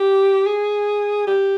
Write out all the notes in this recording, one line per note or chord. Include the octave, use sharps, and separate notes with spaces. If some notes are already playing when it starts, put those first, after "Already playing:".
Already playing: G4
G#4
G4